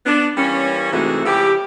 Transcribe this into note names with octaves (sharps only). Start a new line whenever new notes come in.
B3 D4
E3 G3 A#3 C#4
G#2 C3 E3 G#3 A3 F#4
C#3 F3 E4 G4